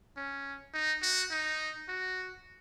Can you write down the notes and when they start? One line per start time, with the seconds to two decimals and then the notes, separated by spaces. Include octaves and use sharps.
0.17 C#4
0.74 D#4
1.03 F#4
1.31 D#4
1.89 F#4